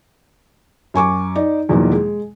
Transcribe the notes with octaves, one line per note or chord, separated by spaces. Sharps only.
F#2 G#5 C#6 D6
D#4 D5
E2 B2 D#3 F3 F#3 A#3
G#3